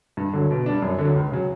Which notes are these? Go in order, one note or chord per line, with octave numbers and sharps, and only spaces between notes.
G2
D3 F#3
B2
G3 D4
F#2
D3 F#3
C#2
C#3 F#3